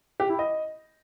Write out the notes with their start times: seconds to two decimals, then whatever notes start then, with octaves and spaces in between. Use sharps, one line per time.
0.20 G4
0.29 E4
0.39 D#5